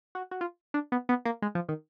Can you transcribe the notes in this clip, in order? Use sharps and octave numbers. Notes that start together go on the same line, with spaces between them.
F#4
F#4
F4
D4
B3
B3
A#3
G#3
F3
D#3